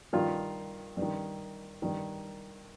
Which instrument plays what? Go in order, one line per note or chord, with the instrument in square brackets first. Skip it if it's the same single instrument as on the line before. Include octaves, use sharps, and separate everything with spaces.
[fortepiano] G2 D#3 F4
G2
D#3
G2 D#3